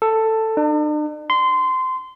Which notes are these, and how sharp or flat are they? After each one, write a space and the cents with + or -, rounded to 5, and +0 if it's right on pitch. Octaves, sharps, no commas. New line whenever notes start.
A4 +10
D4 +45
C6 -20